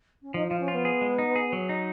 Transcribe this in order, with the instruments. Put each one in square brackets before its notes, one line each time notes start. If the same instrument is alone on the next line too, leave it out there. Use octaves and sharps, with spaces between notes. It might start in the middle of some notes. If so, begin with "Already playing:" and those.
[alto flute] C#4
[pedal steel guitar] F3 [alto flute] D#4
[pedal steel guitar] F3 [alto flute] F4
[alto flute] C#4
[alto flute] B3 [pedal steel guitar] F4
[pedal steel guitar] G#4
G#3
D#4
G#4
F#3
D#4